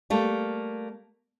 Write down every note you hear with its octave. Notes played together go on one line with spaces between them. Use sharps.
G3 A3 A#3